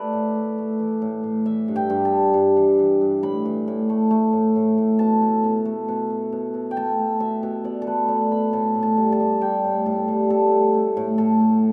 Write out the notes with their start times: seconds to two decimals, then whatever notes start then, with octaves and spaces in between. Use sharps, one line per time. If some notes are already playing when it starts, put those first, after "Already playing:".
Already playing: A3 B4 D5
0.13 A2
0.35 A3
0.58 A3
0.79 E3
1.02 A2
1.24 A2
1.46 E3 E5
1.68 G2
1.76 G5
1.90 G2
2.05 A5
2.12 G3
2.34 G2
2.57 E3
2.79 E3
3.01 G2
3.23 A2 B5
3.45 E3
3.68 A2
3.89 A3
4.11 A3
4.33 A2
4.56 A2
4.78 A2
4.99 B2 A5
5.21 A3
5.44 B2
5.65 A3
5.88 B2
6.10 B2
6.32 B2
6.54 B2
6.71 G5
6.77 A3 A5
6.99 A3
7.20 B2 E5
7.43 B2
7.64 B2 D5
7.82 A4
7.87 A3 B4
8.08 A3 D5
8.32 B2 B5
8.53 A2 A5
8.75 A2
8.83 A5
8.97 G3
9.12 A5
9.20 G3
9.41 G3 G5
9.64 A2
9.86 A2 A5
10.08 G3
10.29 A2 A4
10.52 A3
10.74 A3
10.97 A2
11.18 A2 A4
11.40 A3